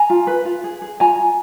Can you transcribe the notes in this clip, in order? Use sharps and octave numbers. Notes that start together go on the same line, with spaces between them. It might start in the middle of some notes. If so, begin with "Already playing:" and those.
Already playing: G#5 A#5
F4
B4
F4
G#4
G#4
F4 G#5 A#5
F4